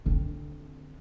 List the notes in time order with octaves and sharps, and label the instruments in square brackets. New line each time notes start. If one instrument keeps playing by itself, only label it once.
[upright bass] D3 C4